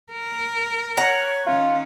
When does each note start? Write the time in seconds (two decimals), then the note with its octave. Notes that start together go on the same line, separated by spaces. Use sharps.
0.12 A#4
0.97 C#5 F#5 A#5
1.47 D#3 C#4 F4